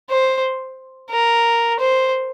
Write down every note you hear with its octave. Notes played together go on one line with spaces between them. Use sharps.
C5
A#4
C5